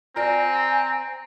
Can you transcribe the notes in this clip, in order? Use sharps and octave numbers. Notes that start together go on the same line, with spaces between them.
C4 F4 D5 G#5 A#5